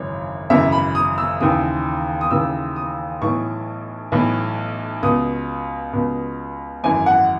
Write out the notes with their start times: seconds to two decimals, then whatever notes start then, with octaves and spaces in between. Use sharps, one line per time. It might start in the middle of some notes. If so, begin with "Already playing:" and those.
Already playing: G#1 F#2 C#3 E3 C#5
0.50 G#1 F#2 C#3 E3 E5
0.72 B5
0.95 D#6
1.18 E6
1.40 D#2 C#3 E3 D#6
2.21 D#6
2.31 D#2 C#3 E3 E6
2.76 D#6
3.22 B1 A2 E3 C#6
4.12 B1 A2 E3
5.03 C#2 B2 D#6
5.93 C#2 B2
6.84 G#1 F#2 E3 G#5
7.06 F#5